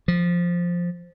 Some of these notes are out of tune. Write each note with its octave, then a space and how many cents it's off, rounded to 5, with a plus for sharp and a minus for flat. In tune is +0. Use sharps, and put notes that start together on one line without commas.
F3 +0